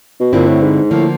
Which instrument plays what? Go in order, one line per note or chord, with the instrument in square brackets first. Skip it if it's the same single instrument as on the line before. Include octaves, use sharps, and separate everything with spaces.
[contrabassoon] B2
[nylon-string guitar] G2 D3 G3 C4 E4 [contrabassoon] A#2
[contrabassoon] A2
G#2
[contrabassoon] A2 [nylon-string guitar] D3 F3 A#3